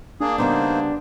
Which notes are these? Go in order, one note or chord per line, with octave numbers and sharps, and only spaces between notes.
A#3 D4 G#4
C#3 G3 A#3 B3 D#4 C5